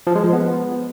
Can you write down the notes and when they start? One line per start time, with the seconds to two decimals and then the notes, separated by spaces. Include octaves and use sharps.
0.07 F3
0.15 G#3
0.24 F3
0.33 B3